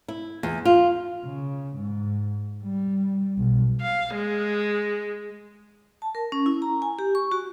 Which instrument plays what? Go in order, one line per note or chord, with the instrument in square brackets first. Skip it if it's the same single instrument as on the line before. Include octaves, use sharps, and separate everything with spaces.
[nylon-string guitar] E4
E2
F4
[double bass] C#3
G#2
G3
B1
[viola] F5
G#3
[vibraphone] A5
A#4
C#4
E4
A#5
G#5
G4
C#6
F#4